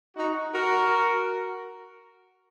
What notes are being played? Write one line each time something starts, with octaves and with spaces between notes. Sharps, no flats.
D#4 F#4
F#4 A#4